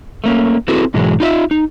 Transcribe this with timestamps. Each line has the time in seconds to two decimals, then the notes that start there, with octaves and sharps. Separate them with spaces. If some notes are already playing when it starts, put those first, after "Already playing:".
0.24 A3 A#3 C#4
0.68 C4 E4 F#4 G#4 A4 B4
0.94 G#2 B2 E3 F#3 G#3
1.20 D#4 F4 D#5 E5
1.51 D#4